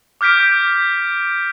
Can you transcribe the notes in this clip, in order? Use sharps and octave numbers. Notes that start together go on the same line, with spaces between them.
D6 F6 G6 B6 D7